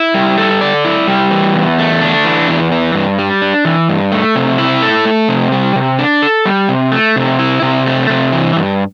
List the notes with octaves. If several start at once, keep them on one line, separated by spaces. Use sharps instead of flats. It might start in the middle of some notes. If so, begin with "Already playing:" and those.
Already playing: E4
G3
A4
D5
E4
G3
E3
E2
A3
D4
E3
E2
E3
G2
G3
D4
E3
G2
A3
C3
E4
A4
A3
C3
G3
C3
D4
A4
G3
C3
A3
C3
E4
C3
A3
C3
E3
G2